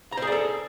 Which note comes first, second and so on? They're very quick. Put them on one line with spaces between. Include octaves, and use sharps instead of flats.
A#5 C5 G#4 D5 A4